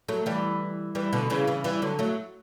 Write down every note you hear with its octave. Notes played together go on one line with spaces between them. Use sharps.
F#3 A3
E3 G3
E3 G3
B2 D3
C#3 E3
C#3 E3
E3 G3
D3 F#3
F#3 A3